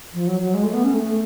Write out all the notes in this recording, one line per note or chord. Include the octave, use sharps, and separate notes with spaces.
F3
F#3
F#3
G#3
A3
B3
C#4
A3